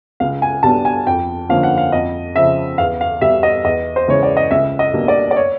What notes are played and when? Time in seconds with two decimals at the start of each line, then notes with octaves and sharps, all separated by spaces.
0.20 C#2 F5
0.42 G#5
0.63 B2 G3 B3 D4 A5
0.85 G#5
1.07 F2 G5
1.49 D3 F3 A#3 C#4 F5
1.63 F#5
1.78 F5
1.92 F2 D#5
2.35 C#3 F3 E5
2.78 E2 F5
3.01 F5
3.21 B2 G3 E5
3.43 D#5
3.64 E2 D#5
3.96 C5
4.08 C#3 E3 G#3 C#5
4.23 D5
4.37 D#5
4.51 C#2 E5
4.79 D#5
4.93 B2 G3 A#3 D4
5.08 D5
5.31 D5
5.36 C#5